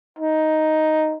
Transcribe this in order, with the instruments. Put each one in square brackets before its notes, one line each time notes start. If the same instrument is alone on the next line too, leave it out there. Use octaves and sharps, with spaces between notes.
[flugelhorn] D#4